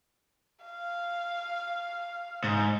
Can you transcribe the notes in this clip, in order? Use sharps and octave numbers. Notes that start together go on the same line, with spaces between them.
F5
G#2